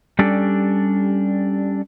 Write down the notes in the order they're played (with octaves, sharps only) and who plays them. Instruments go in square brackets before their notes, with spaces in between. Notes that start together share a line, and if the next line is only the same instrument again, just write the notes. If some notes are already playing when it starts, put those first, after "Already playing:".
[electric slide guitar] G3 C#4 D4 G4 A4 D5